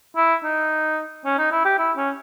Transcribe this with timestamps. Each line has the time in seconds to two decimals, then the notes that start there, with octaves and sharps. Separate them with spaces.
0.16 E4
0.44 D#4
1.25 C#4
1.38 D#4
1.52 E4
1.65 G4
1.79 E4
1.97 C#4